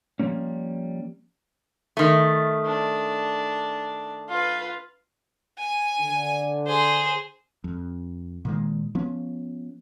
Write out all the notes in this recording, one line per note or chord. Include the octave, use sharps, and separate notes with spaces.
F3 G3 A#3 C#4
D#3 A3
D4
F4 B4
G#5
D3
G#4 C5
F2
A#2 D#3 G#3
F3 B3 C#4